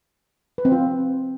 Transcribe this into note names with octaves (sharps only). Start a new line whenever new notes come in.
B4
C4
F4